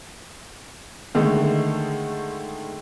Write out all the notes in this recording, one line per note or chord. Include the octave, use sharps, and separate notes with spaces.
D3 D#3 G#3 A3